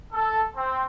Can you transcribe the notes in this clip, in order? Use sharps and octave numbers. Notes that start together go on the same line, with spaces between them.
A4
C4